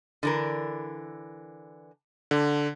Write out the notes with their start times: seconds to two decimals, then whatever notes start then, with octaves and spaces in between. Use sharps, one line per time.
0.23 D3 E3 A#4
2.31 D3